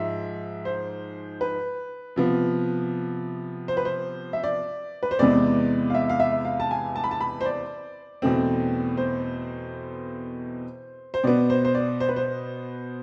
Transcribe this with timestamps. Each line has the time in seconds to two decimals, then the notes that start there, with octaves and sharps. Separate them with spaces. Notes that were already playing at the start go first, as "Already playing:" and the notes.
Already playing: G#2 F3 G#3 E5
0.65 C5
1.41 B4
2.16 C3 F3 B3
3.68 C5
3.77 B4
3.85 C5
4.33 E5
4.44 D5
5.03 B4
5.11 C5
5.19 E2 C3 G#3 B3 D5
5.90 F5
5.95 E5
6.10 F5
6.20 E5
6.45 F5
6.60 A5
6.71 G#5
6.96 A5
7.04 B5
7.11 A5
7.21 B5
7.41 C5
7.46 D5
8.22 E2 B2 A3 C4
8.97 C5
11.14 C5
11.24 B2 B3 D5
11.50 C5
11.65 C5
11.75 D5
12.00 C5
12.09 B4
12.16 C5